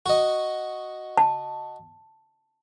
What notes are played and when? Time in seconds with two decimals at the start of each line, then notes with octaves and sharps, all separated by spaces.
0.06 F#4 D#5
1.17 A5